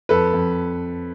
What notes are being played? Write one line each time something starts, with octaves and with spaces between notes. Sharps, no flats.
F2 A4 B4
F2